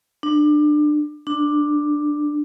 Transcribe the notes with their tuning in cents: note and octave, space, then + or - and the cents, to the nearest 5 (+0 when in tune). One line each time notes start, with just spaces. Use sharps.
D4 +25
D4 +10